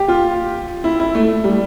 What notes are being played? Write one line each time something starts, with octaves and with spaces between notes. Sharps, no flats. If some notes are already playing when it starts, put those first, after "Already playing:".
Already playing: G4
F4
E4
E4
A3
G3